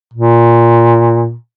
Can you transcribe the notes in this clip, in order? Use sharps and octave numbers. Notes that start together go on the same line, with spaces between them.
A#2